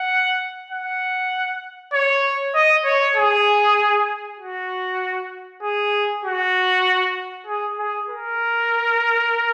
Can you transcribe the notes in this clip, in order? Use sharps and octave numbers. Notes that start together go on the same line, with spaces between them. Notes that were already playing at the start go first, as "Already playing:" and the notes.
Already playing: F#5
F#5
C#5
D#5
C#5
G#4
F#4
G#4
F#4
G#4
G#4
A#4